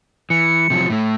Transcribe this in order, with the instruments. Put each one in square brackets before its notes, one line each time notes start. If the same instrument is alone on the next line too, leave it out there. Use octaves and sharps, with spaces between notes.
[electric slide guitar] E3 [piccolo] C#7
[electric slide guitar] C3 F3 F#3
A2 A3